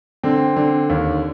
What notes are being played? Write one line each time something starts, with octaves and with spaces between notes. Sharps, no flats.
D3 C4
D3
D#2